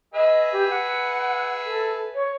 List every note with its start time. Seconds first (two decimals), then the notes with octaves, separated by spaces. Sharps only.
0.14 G#4 B4 D#5 E5
0.53 G4
0.70 F#5
1.66 A4
2.15 C#5